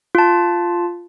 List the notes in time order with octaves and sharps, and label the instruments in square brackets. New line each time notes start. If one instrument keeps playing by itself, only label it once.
[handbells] F4 A5